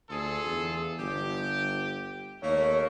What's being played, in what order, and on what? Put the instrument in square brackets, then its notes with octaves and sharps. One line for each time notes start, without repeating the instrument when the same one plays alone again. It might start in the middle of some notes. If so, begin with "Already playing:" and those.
[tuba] D2 [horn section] F4 G#4 A4
[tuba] E2
[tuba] G1 [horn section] G4
[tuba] D#2 [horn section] A3 A#3 [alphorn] C#5